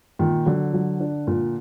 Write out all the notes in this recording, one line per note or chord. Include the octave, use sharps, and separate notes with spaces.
A#2 D#3
D3 F#3
F#3
D4
A#2